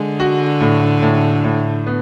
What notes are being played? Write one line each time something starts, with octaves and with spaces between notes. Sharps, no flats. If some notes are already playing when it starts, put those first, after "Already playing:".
Already playing: D3 G#3
F#4
A2
A2
A2
B3